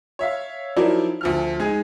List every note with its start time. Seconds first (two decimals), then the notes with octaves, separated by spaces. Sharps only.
0.19 C#5 E5 F5
0.76 F3 F#3 D#4 E4 A#4 D5
1.21 D2 F3 F6
1.59 G#3 D#4 G#4